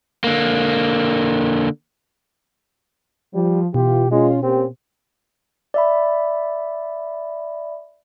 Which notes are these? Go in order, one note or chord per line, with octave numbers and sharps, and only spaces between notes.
D3 A#3
F3 G3
B2 E3 F4 G4
G#3 C#4 F4
A#3 C4 C#4 G4
D5 E5 B5